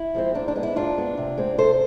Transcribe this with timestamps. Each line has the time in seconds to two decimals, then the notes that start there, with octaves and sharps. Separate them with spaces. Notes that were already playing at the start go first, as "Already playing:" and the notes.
Already playing: E4
0.15 F3 G#3 C4
0.35 G#2 D4
0.48 D4
0.56 G#3 B3
0.63 E4
0.76 G#2 D4 F4
0.97 G#3 B3
1.17 C3
1.38 G#3 C4
1.58 C3 A4 C5